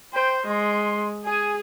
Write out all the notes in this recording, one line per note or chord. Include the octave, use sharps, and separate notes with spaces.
C5 G5
G#3 C6
G#4 G#5